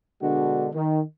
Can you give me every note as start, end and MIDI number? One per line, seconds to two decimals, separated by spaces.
0.22 0.68 47
0.22 0.68 50
0.22 0.68 56
0.22 0.68 62
0.22 0.68 66
0.74 1.00 51